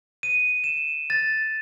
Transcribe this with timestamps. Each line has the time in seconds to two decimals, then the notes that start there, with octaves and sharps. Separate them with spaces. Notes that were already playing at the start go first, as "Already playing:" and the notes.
0.23 D#7
0.64 E7
1.10 A6